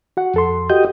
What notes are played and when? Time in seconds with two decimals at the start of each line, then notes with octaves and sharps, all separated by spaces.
0.17 F#4 F#5
0.34 F2 A4 C6
0.70 F#4 G4 D#5 G6